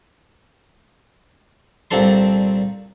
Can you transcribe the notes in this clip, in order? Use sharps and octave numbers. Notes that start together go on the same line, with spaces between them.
C2 A#2 C4 D4 A4 C6